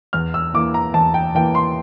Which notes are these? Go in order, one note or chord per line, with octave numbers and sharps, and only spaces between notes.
E2 F6
E6
E3 A#3 D6
A#5
E2 A5
G5
E3 A#3 G5
C6